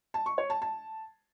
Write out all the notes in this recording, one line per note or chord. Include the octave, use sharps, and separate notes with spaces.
A5
C#6
C#5
A5
A5